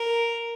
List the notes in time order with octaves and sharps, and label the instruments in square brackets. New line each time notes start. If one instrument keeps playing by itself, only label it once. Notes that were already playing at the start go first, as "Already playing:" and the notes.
Already playing: [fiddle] A#4